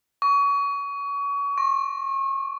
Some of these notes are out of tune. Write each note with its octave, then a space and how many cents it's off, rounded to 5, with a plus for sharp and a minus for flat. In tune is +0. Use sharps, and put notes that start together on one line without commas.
C#6 +30
C#6 -35